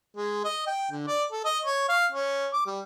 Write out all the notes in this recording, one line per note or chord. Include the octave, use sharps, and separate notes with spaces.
G#3
D#5
G5
D3
D5
A4
D#5
C#5
F5
C#4
D6
G3